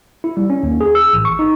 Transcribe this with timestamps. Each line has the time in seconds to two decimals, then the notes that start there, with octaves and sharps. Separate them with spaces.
0.24 E4
0.37 G3
0.50 C#4
0.63 D#2
0.81 G#4
0.95 E6
1.13 A1
1.25 C#6
1.39 D#4